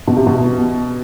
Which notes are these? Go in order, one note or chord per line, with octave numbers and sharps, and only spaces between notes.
B2
C3
B2